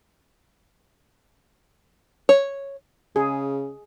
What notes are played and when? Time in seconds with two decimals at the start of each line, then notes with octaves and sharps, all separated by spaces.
2.29 C#5
3.16 C#3 G#4